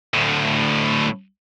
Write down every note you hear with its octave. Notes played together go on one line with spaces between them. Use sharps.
D2 A2